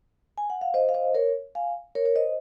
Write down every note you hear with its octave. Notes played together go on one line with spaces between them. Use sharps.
G#5
F#5
F5
C5 D#5
F5
C5 D#5
A#4 C#5
F5 G#5
A#4 C#5
A#4 C#5
C5 D#5